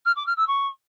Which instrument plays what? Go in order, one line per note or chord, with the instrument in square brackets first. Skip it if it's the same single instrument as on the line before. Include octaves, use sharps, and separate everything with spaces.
[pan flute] F6
D6
F6
E6
C#6